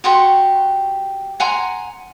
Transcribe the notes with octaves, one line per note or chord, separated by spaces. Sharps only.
F#4 G4 C6 C#6
F#5 G#5 A#5 C6